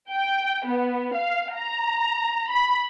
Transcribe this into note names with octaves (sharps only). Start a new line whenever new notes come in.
G5
B3
F5
A#5
B5